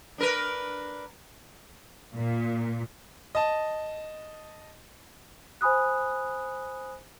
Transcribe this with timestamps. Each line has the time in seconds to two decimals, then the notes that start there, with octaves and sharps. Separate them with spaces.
0.18 D4 A#4 B4
2.15 A#2
3.35 D#5 A5
5.61 C5 G#5 B5 D#6 F#6